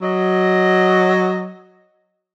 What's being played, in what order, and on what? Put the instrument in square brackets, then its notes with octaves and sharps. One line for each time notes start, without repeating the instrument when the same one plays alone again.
[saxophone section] F#3 D#5